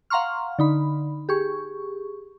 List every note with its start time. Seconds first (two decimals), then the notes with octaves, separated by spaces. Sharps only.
0.10 F5 F#5 A#5 C6 C#6 F6
0.59 D3 D#4 B5
1.29 G4 G#4 C#6